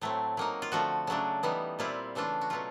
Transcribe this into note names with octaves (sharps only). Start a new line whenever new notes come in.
A2 F#3 A3 C4
F#3 A#3 D#4
F4
D3 F3 A3 F#4
C#3 F#3 A3 D4
E3 G3 B3 D#4
A#2 G3 C4 E4 F4
C#3 E3 A3 D4 F4
F#4
B2 F#3 A3 F4